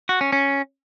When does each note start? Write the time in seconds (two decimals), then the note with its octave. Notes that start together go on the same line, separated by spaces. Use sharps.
0.09 F#4
0.21 C#4
0.32 C#4